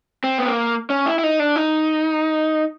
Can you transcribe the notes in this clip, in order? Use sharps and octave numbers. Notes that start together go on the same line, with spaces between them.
C4
B3
A#3
C#4
E4
E4
D#4
D4
D#4